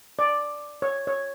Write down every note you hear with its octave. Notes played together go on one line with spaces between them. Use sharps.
D5
C#5
C#5